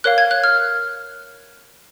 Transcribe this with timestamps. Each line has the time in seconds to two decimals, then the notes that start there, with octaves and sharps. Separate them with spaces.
0.04 A#4 C#5 F5 F#6
0.18 G#6
0.31 F#6
0.44 F6